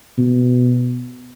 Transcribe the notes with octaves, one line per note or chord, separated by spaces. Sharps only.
B2